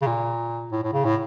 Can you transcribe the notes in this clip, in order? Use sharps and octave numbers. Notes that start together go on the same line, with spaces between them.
C#3
A#2
A2
A2
C#3
A2